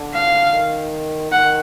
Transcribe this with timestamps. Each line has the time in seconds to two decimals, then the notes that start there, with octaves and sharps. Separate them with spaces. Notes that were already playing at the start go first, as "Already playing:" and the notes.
Already playing: D3
0.14 F5
0.53 D#3
1.32 D#3 F#5